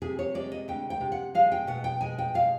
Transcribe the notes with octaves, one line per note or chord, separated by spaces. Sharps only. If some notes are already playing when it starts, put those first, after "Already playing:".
C3 G#4
C#5
G#3 D5
D#5
D2 G5
G5
C3
F#5
G#3 F5
G5
B2 F#5
G5
G#3 G#5
G5
B2 F5